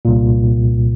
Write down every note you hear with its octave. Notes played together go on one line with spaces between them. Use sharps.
C2 A#2